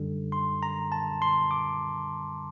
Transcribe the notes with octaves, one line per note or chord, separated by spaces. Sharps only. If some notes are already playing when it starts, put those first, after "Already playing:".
Already playing: F#2 D3 G3
C6
A#5
A5
C6
D6